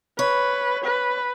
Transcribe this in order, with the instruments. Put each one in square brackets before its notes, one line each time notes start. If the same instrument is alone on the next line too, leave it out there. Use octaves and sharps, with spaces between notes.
[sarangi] B4 [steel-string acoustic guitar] C#5
[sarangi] B4